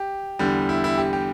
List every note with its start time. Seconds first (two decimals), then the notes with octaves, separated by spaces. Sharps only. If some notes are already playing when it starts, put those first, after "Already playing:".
Already playing: G4
0.39 E2 D3 G3
0.69 E4
0.84 E4
0.98 G4
1.13 G4